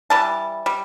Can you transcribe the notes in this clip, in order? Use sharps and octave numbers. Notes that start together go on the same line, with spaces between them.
E3 G3 A5
G3